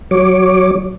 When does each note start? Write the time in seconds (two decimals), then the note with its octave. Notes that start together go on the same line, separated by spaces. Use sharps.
0.11 F#3 C#5 D6